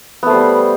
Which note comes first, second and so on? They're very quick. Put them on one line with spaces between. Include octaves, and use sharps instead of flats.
B3 A3 C5 G3